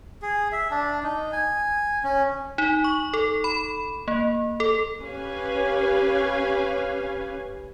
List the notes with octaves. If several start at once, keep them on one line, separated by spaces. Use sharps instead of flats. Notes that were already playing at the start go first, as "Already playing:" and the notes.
G#4
E5
D4
D#4
G#5
C#4
D#4
C#6
A4
B5
A#3
A4
C#4 G4 B4 C#5 F5 G#5